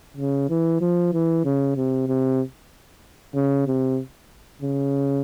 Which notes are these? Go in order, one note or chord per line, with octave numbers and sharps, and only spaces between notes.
C#3
E3
F3
E3
C#3
C3
C3
C#3
C3
C#3